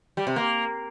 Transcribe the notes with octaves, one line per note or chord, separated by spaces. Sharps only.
G3
C3
A#3